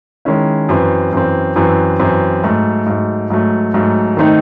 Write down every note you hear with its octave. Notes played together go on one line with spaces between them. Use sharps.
D#3 G#3 C#4 E4
F#2 E3 C4
F#2 E3 C4
F#2 E3 C4
F#2 E3 C4
G#2 F#3 A3
G#2 F#3 A3
G#2 F#3 A3
G#2 F#3 A3
D#3 A3 C4 D#4